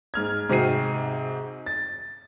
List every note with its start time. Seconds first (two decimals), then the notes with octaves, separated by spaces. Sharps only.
0.14 G#2 F6 G#6
0.49 G#2 C3 C4 F#4 C7 D#7
1.66 A6